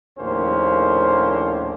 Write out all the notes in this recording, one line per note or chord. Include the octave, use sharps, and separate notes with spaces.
A#1 D#2 A2 A#3 C#4 C5